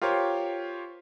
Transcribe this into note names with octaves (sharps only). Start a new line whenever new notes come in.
F4 G4 A#4 C5 C#5